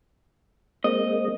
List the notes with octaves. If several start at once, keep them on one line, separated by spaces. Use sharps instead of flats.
G#3 A#3 C4 D#5